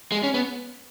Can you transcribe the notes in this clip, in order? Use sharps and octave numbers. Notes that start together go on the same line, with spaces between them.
G#3
C#4
B3